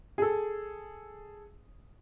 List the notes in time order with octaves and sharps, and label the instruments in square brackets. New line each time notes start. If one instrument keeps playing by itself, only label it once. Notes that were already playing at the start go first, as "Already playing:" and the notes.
[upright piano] G#4 A4